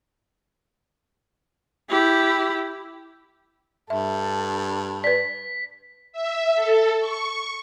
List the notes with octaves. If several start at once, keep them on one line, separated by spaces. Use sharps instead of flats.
E4 G4
G2 A4 E5
B4 D5 B6
E5
A4
C#6